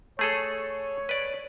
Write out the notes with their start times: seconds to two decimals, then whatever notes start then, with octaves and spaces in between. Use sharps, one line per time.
0.19 A3 G#4 A4 C#5
1.09 B4 D5